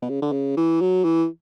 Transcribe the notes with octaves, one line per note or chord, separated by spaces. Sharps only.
B2
C#3
D3
C#3
E3
F#3
E3